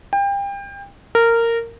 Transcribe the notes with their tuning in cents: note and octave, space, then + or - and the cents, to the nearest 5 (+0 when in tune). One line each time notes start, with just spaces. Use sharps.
G5 +30
A#4 -15